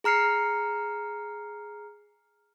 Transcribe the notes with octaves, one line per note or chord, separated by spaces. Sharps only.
G#4 A#5 F6 C7 C#7